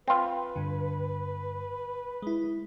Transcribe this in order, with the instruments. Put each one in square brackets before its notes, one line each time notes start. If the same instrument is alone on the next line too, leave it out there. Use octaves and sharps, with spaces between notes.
[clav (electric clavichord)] C4 F4 [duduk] B4
[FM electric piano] G2 D3
G#3 E4